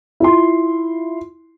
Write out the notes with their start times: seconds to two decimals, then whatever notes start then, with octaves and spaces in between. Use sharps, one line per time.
0.20 E4 F4 C6